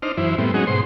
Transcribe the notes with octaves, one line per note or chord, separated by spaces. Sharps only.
D4 D#4 C5 F6
F#2 E3 E4 C5
A2 G3 B3 C4
F#3 G#3 C#4 D#4 F#4 G#4
G#2 B2 C5 C6